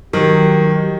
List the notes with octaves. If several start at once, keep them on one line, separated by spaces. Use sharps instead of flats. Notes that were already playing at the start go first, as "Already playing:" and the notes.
D#3 F#3 G4